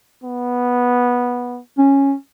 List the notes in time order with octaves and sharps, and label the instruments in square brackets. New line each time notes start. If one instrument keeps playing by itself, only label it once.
[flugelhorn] B3
[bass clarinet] C#4